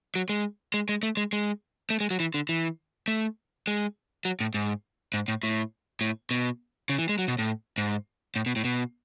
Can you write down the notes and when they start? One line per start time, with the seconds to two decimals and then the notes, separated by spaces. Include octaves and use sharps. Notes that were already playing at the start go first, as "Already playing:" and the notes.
0.15 F#3
0.29 G#3
0.74 G#3
0.89 G#3
1.03 A3
1.17 G#3
1.33 G#3
1.90 A3
2.00 G#3
2.11 F#3
2.20 E3
2.34 D3
2.49 E3
3.08 A3
3.67 G#3
4.25 F#3
4.40 A2
4.54 G#2
5.14 G#2
5.28 A2
5.43 A2
6.01 A2
6.31 B2
6.89 C#3
6.98 E3
7.09 G#3
7.19 F#3
7.28 B2
7.39 A2
7.78 G#2
8.36 A2
8.46 B2
8.56 A2
8.65 B2